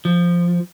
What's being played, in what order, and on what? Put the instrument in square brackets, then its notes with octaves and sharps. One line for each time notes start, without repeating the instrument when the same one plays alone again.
[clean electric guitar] F3